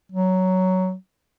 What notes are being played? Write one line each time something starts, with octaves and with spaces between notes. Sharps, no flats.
F#3